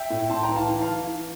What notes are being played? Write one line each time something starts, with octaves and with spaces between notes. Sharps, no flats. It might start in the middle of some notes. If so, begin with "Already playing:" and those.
Already playing: E5 G5
A2
A2 A5 C6
G5 A#5
E3
F5 A5
E3
F5 A5
E3
E3